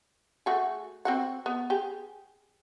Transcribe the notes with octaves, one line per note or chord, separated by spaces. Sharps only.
A3 F#4 G#4
C4 F#4 F#5
B3
G4 G#4